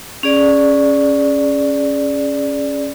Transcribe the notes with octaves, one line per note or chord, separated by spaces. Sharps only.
C#4 G#4 D5